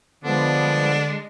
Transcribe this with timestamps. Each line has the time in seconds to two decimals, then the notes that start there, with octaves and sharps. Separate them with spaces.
0.24 D3 F3 G#3 B3 D4